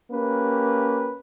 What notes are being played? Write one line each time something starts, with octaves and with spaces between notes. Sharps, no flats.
A#3 C#4 G4 B4